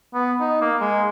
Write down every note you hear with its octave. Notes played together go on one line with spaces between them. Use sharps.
B3
D#4
A#3
G#3